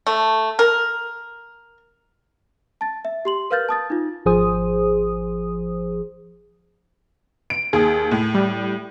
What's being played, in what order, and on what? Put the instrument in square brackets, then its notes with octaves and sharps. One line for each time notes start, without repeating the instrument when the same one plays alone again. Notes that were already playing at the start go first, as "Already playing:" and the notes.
[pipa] A3
A#4
[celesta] A5 A6
E5
G4 C6 F#7
A#4 B4 F5 F6 G6 A6
A5 D#6 A6
D#4 F4
[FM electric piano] G#1 F3 G#4 C5 D#6
[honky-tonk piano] D7
[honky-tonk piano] D#2 [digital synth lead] G#4
[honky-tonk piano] A2
[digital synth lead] G3